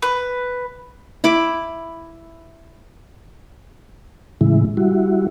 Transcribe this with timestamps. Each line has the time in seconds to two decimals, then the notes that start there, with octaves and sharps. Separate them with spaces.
0.02 B4
1.24 E4 B5 D6
4.41 A2 C#3 E3 G#3 E4
4.77 G3 E4 F#4